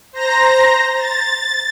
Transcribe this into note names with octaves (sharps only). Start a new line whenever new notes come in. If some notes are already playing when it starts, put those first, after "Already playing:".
C5 A#5 A#6
A6